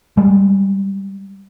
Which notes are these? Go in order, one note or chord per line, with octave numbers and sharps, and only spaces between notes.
G3 G#3